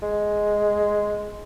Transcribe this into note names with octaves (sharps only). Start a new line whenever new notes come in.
G#3